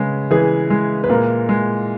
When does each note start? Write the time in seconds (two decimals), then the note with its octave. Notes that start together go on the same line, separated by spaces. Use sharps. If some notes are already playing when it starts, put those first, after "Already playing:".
Already playing: C#3 G#3 B4
0.31 E3 G#4 B4
0.70 G#3
1.04 B4
1.10 A#2 A#4
1.49 G#3